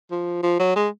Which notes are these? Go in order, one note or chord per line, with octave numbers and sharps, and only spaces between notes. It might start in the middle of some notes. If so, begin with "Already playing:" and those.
F3
F3
F#3
G#3